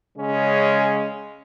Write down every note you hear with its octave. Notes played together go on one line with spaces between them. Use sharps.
C#3 G#3 C#4